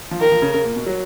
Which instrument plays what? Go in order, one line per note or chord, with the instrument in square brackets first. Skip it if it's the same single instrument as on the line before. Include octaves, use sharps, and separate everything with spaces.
[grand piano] F3
[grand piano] D#3 [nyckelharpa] A#4
[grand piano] F3
C#3
C#3
A#2
B2
F#3